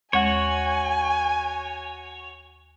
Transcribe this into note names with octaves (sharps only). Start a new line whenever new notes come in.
D#2 G#3 F#4 C#5 F#5 G#5